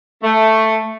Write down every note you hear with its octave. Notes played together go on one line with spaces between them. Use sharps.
A3